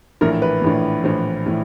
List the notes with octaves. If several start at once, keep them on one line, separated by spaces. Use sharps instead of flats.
A#1 A2 E3 A#4
B4
A#1 A2 E3
A#1 A2 E3 C5
A2 E3